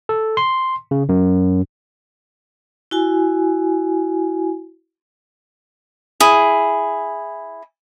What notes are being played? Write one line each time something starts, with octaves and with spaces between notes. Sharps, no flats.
A4
C6
C#3
F#2
E4 F#4 G#5
E4 G#4